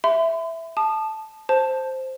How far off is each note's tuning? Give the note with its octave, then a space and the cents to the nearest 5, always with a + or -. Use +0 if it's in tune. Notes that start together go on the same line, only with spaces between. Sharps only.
E5 +0 B5 +45
A5 -10 D#6 -35
C5 +0 A5 +0